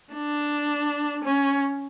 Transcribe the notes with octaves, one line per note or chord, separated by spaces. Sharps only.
D4
C#4